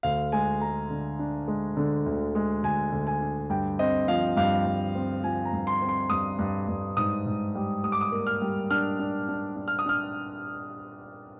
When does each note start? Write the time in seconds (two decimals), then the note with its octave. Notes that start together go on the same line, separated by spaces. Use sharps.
0.03 D2 F5
0.32 G#3 G#5
0.61 G#3 A#5
0.90 D3
1.19 D4
1.48 G#3
1.77 D3
2.06 D2
2.35 G#3
2.63 D2 G#5
2.92 D2
3.07 G#5
3.21 D4
3.50 G2 G5
3.79 C4 D#5
4.08 F3 F5
4.37 G2 F5
4.65 G2
4.95 C4
5.23 F3 G#5
5.45 A#5
5.53 G2
5.67 C6
5.82 C4
5.89 C6
6.10 G2 D#6
6.39 G2
6.68 G2
6.97 G#2 D#6
7.26 G#2
7.55 G3
7.83 G3 D#6
7.92 D6
8.01 D#6
8.12 A#3
8.27 F6
8.41 G3
8.70 D4 F6
9.00 D4
9.29 D4
9.56 D4
9.68 F6
9.79 D#6
9.86 D4 F6